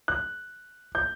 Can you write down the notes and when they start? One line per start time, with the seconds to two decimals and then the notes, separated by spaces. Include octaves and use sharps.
0.08 F#6
0.95 G6